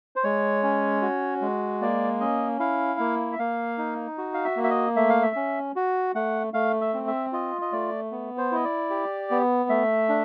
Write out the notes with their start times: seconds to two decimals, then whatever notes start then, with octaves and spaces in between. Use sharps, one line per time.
0.16 C5
0.24 G#3 C#5
0.63 C#4
1.02 F#4
1.41 G#3
1.81 A#3 D5
2.20 C#4 D#5
2.59 E4 F5
3.00 A#3
3.32 E5
3.39 A#3 F5
3.78 D#4
4.18 F#4
4.34 F5
4.45 E5
4.57 A#3
4.64 E5
4.70 D#5
4.96 A3 E5
5.10 F5
5.23 E5
5.36 C#4
5.76 F#4
6.15 A3 F#5
6.54 A3 F5
6.81 E5
6.94 C4
7.07 E5
7.33 F4 D#5
7.61 D#5
7.72 A3 D5
8.11 B3
8.38 C5
8.52 E4 D#5
8.64 D5
8.90 G4
9.31 B3
9.70 A3 E5
10.09 D4